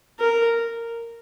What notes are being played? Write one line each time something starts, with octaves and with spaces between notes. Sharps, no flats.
A#4